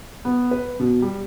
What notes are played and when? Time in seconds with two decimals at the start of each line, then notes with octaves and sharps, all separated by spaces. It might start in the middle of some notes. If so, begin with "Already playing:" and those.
0.25 B3
0.51 B4
0.80 B2
1.02 G3